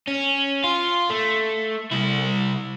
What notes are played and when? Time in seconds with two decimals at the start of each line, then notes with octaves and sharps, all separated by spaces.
0.07 C#4
0.64 F4
1.10 A3
1.91 C2 E4